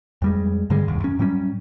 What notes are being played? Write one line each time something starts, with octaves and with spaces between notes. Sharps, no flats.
F2 G3 G#3
G2 D3 G3 G#3
E1 D#2
F#2 C#4
A2 F#3 G3 C#4